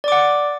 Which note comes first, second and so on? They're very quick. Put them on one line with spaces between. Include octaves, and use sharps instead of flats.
D5 D6 F#5